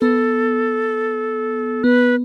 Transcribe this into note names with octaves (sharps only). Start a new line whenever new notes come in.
B3 A4
B3 B4